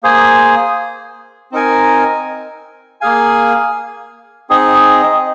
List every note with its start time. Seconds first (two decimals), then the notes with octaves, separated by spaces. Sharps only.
0.03 A#3 G#4 C5 G#5
1.52 C4 D#4 A#4 G#5
3.01 A#3 G#4 F5 G#5
4.50 C4 D#4 G#4 D#5